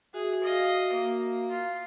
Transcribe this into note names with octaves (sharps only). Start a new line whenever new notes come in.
F#4 G#4 E5
D#5 F5
A#3
F4